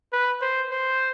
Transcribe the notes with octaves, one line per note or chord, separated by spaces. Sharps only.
B4
C5
C5